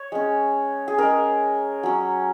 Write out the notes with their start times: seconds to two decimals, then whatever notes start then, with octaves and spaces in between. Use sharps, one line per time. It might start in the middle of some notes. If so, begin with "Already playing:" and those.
Already playing: C#5
0.12 G#3 C#4
0.88 G#4
0.98 G#3 C#4 A#4
1.83 F#3 C#4